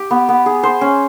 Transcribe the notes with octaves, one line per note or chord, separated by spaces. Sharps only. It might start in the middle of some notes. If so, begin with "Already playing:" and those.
Already playing: G4
B3
B3
G#4
C5
C#4